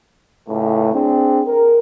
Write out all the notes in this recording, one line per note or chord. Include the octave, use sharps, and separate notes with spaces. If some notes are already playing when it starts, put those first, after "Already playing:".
C#2 A2
C4 D4 G#4
A#4